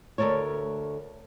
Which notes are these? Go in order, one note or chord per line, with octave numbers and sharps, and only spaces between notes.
D2 D#3 A4 A#4 C#5